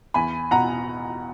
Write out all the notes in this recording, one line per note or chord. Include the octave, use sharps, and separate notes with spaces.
E2 G#5 B5
B2 F#5 A#5